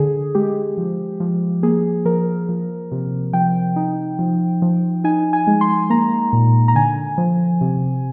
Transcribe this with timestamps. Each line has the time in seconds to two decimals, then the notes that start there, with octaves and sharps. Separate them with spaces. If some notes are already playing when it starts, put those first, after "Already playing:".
Already playing: D3 G#4
0.35 G#3 G4
0.77 F3
1.20 F3
1.63 A#3 G#4
2.05 F3 A#4
2.49 F3
2.92 C3
3.33 F3 G5
3.76 D#4
4.19 F3
4.62 F3
5.04 D#4 G#5
5.33 G#5
5.47 G#3
5.61 C6
5.90 A#3 A#5
6.33 A#2
6.68 A#5
6.75 D3 G#5
7.18 F3
7.61 C3